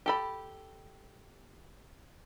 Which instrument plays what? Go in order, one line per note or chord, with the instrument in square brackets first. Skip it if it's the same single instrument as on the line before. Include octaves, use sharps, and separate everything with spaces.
[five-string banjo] G4 A4 B5